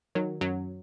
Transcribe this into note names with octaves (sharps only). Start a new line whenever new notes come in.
D#3 F#3
F#2 F#3